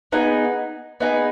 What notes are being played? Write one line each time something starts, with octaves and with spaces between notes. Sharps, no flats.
B3 D#4 G#4
B3 D#4 G#4